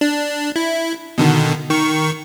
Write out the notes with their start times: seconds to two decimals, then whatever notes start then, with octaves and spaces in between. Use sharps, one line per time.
0.01 D4
0.56 E4
1.18 B2 D3 D#3
1.70 D#3 C#6